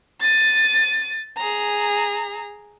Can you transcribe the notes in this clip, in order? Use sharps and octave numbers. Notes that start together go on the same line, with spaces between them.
A6 D#7
G#4 A#5